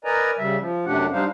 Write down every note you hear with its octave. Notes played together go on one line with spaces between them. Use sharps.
A#4 B4 D5 D#5 G#5 A#5
C#3 G3 E5
F3
F#2 C3 A3 D4 G4 F#5
G3 D4 D#4 C5 F5